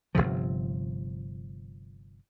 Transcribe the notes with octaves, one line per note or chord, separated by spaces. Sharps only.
G1 C#2 C3 F3